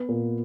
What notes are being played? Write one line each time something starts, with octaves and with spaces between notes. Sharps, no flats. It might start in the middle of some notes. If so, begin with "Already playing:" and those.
Already playing: B3
A#2